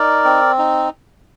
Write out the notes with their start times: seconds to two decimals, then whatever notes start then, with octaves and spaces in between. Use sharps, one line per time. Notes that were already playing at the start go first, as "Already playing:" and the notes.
Already playing: D#4 A#4 D5
0.25 C4
0.58 D#4